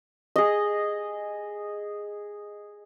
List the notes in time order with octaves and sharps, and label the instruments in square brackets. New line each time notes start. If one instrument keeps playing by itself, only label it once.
[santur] G#4 D#5